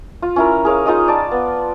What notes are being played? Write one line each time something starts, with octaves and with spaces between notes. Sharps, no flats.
F4
C#4 E4 A#4
G#4 A#4 C#5 F5
D#4 F4 G#4 D#5
D5 A5
B3